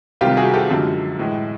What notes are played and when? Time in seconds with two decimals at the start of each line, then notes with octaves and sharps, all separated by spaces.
0.21 C2 C3 D#3 G3 F4 G4
0.37 F#4 G#4
0.54 G4 A4
0.69 F#2 D3 F3 G#3
1.19 A2 E3 G#3